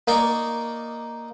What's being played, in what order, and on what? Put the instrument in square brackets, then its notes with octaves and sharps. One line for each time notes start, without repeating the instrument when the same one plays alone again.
[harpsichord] A#3 D#4 D5 C#6